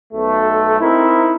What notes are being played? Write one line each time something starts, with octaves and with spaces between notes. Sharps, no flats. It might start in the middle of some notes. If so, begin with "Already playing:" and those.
B1 A3
C4 D#4 E4 A#4